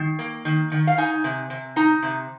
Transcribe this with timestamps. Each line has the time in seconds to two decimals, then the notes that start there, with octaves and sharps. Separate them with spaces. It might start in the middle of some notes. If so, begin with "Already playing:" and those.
Already playing: D#3
0.19 A#3
0.45 D#3
0.72 D#3
0.87 F5
0.98 D#4 G#5
1.24 C3
1.50 C3
1.76 D#4 A#5
2.02 C3